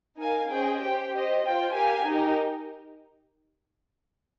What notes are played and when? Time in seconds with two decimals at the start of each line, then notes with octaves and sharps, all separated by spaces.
0.19 D#4 A#4 F5 G#5
0.49 C#4 G#4 C5 D#5 G5
0.81 G4 C5 G5
1.11 G4 C5 D#5
1.44 F4 C5 G5
1.74 G4 A#4 F5 G#5
2.06 D#4 G4 A#4